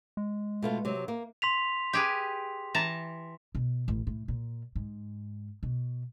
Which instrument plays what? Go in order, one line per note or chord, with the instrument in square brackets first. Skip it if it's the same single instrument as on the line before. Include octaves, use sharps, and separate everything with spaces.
[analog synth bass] G#3
[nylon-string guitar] B2 A3 F4
C3 F#3
A#3
[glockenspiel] C6 B6 F7
[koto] G4 G#4 B4
E3 A5 A#5
[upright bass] B2
A1
A2
A#2
G#2
B2